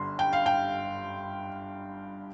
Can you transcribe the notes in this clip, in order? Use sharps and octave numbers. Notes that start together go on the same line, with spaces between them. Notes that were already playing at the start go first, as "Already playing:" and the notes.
Already playing: G1 G2 D3 C6
G5
F5
G5